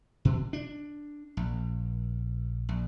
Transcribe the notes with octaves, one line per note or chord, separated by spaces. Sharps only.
B2
D4
A#1
A#1